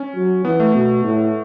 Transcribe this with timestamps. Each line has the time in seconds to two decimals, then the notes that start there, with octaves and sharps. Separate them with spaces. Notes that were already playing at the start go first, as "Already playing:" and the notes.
Already playing: C#4
0.15 F#3
0.45 E3 B3
0.60 A3
0.74 B2 B3
1.04 A2